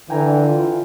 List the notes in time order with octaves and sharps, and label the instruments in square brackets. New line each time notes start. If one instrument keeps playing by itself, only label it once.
[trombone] D3 [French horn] E3 [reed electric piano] G5 G#5 A#5
[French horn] F4